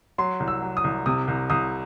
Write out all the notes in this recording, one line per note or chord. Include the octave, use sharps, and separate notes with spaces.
F#3 C6
C2
E6
F#3
D#6
C2
C3 D#6
C2
C2 D#6